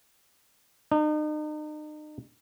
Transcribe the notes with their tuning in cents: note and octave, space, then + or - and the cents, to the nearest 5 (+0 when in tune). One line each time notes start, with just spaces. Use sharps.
D#4 -40